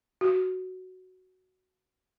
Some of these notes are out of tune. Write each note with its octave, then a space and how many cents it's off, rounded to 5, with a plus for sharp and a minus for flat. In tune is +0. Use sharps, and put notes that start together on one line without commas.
F#4 +5